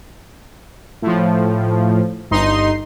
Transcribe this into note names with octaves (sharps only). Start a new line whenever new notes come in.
A2 F3
G1 D#4 C6